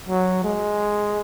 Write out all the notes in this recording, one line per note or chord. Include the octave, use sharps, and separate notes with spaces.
F#3
G#3